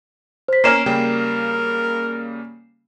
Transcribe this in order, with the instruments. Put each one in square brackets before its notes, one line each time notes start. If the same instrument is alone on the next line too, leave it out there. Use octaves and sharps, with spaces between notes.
[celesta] C5 B6
[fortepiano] A#3 C#4 A#4 [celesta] C7 E7
[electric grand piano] C#3 G3 A#3 [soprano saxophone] A#4 [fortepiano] G5